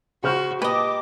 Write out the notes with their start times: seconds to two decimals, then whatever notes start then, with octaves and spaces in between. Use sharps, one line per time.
0.24 C#3 F#4 C5 F6
0.62 A#2 G4 B4 D#5 A5 D6